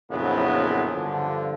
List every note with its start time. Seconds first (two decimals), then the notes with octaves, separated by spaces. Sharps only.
0.11 A#1 F2 C#3 F#3 B3 E4
0.95 G2 D3 F3